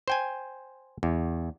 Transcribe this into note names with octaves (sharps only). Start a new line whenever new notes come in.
C5 G5 G#5
E2